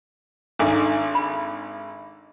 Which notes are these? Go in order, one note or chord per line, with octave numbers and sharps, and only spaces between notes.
G#1 D4 D#4 A4 F5 G#5 A#5
B5